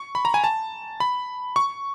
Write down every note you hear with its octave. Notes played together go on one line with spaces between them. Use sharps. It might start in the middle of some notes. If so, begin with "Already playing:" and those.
Already playing: C#6
B5
A#5
G#5
A5
B5
C#6